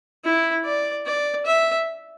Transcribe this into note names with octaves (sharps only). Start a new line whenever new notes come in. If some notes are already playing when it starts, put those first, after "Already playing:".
E4
D5
D5
E5